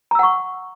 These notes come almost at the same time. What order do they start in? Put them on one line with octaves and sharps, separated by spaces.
A#5 E6 F#5 C#6